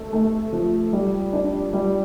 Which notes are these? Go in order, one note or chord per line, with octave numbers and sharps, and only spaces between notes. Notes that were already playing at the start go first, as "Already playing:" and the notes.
Already playing: A3
A3
F3
G3
D4
G3